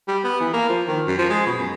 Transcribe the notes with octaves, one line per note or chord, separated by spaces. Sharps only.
G3
B3
E3
A#3
F3
D#3
F#2
F3
G#3
B2
F#2